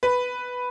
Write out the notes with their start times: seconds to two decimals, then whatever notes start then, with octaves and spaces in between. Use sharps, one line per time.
0.03 B4